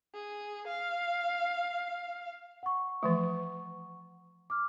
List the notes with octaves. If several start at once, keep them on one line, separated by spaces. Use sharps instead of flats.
G#4
F5
F#5 C#6
E3 F3 A3
D6 F6